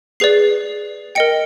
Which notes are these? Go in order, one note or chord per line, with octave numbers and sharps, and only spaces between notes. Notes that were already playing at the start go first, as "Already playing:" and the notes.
G#4 B4 D5 C7
A#4 D#5 G5 C#7